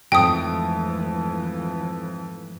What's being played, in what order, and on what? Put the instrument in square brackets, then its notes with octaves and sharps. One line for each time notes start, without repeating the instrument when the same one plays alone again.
[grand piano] F2 [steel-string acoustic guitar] G#2 A3 [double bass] E3 F3 [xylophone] G5 D#6